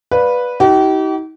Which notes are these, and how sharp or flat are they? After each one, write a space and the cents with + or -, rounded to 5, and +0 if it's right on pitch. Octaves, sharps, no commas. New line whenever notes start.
B4 -5 D5 +0 F5 +25
D#4 +40 G4 -40